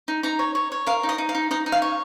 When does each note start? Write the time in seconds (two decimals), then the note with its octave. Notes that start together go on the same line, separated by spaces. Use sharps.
0.08 D#4
0.23 D#4 A#5
0.39 C#5
0.55 C#5
0.72 C#5
0.87 A#4 F5
1.03 D#4
1.09 D#5
1.18 D#4
1.29 F5
1.35 D#4
1.51 D#4 D#5
1.66 D#4
1.72 F5
1.82 C#5